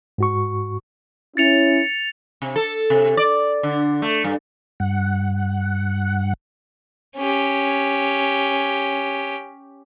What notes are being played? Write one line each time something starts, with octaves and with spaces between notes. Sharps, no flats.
G#2 F#4 C#6
C#4 E4 A6 C#7 F7
C3
A4
C3
D5
D3
A3
G2
G2 F#5
C#4 G4